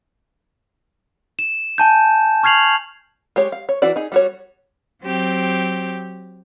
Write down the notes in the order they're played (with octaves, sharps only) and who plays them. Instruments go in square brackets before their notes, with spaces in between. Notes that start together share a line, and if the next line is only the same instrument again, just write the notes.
[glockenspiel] E7
G#5 A5 G6
C#6 F6 G#6 C7 F7 F#7
[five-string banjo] G#3 G4 C#5
F5
C#5
E3 E4 F#4 D5
D#4 G#4
G3 F#4 C#5
[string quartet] F#3 C4 G4